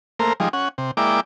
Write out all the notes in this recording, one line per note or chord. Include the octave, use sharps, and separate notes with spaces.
A3 A#3 A#4 C5
F3 G3 G#3 D#4
C#4 F#5
C3
G#3 A#3 E4 D5 G5 D6